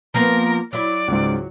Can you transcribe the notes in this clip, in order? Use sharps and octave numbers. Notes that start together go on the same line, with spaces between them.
F3 A#3 B3 A#4
F#3 E4 D5
C#2 G#2